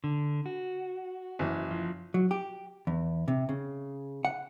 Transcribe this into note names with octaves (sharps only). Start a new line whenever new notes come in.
D3
F#4
F#1 E3
F3
F#3
G4
E2
C3
C#3
F#5